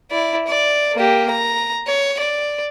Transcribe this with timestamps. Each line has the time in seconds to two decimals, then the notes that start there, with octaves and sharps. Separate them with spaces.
0.11 E4 D5
0.47 D5
0.95 A#3 G4
1.30 A#5
1.87 C#5
2.19 D5